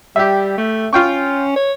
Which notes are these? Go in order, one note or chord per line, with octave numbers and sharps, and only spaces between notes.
G3 G4 E5
A3
C#4 F4 G5 C#6
C#5